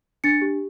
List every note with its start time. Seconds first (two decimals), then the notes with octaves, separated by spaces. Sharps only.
0.24 D4 A6 C#7
0.41 G4